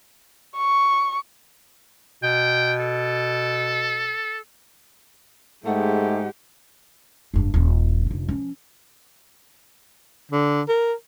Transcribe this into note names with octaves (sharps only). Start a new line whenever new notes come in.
C#6
B2 G5
A4
G#2 G#3 A3 G4 F#5
F1 G2
D#1 E3
F1 D3
F3 C#4
D3
A#4